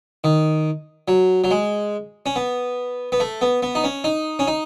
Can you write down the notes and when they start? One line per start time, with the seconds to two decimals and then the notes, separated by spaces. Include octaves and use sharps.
0.24 D#3
1.08 F#3
1.44 F#3
1.51 G#3
2.26 C#4
2.36 B3
3.12 B3
3.20 A3
3.41 B3
3.62 B3
3.75 D#4
3.84 C#4
4.04 D#4
4.39 C#4
4.47 D#4